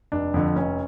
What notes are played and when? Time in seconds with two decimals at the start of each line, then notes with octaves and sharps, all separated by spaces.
0.12 F1 D4
0.34 F2 D3
0.56 F1 C#4